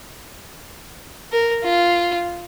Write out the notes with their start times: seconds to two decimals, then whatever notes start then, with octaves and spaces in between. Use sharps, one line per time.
1.32 A#4
1.64 F4